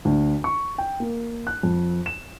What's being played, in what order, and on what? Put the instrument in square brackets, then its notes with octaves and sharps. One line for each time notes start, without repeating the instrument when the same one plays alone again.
[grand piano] D2
C#6
G5
A#3
F#6
F2
E7